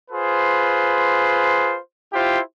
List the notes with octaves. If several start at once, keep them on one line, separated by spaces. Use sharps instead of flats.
F4 G#4 B4 C5
E4 F4 G4 C5